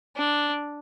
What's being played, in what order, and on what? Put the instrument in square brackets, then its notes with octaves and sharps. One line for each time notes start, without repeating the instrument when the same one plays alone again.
[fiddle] D4